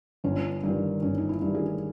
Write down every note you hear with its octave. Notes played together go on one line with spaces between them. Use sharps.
G1 C#4
G2 D#3
G1 C#4
D#4
E4
G2 D#3
G#4